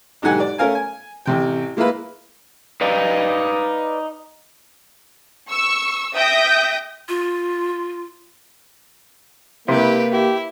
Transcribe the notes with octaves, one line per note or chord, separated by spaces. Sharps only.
B1 G#2 D3 G4 F#5 G#5
D5
A3 C#4 A#4 F5 G#5
G#5
A1 C3 G5
G#3 A#3 E4 F4 B4
D#4 B4 D5 F5
C#6 E6
E5 G5 D#6 G6 A#6
F4
C3 A#3 E4 G4 B4
E4 G4